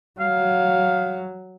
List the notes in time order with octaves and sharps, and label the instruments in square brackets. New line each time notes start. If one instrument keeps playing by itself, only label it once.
[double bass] F#3 [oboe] F5